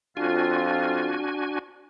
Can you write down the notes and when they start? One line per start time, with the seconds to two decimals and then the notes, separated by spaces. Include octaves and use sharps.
0.17 F2 D4 F4 F#4 G#5